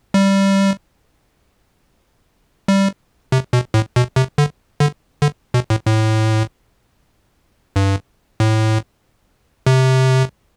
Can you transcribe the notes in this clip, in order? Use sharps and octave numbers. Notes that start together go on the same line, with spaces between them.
G3
G3
C3
B2
A2
B2
C3
D3
D3
D3
B2
A2
A2
G2
A2
C3